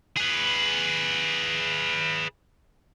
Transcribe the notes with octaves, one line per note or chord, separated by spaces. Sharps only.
G#4 B4